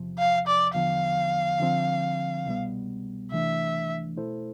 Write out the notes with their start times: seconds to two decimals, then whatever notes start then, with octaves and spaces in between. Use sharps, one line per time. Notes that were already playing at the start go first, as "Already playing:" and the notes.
Already playing: E2 C3 F3
0.18 F5
0.47 D5
0.74 E2 D3 F3 B3 F5
1.60 D3 F3 C4
2.46 C2 B2 G3 B3
3.32 C2 C3 E3 A3 D4 E5
4.17 B2 A3 E4 A4 C5